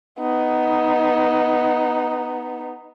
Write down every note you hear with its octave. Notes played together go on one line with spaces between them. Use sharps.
B3 D#4